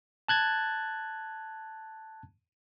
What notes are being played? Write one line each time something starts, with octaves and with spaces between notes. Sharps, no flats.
A5 F#6 G#6 A6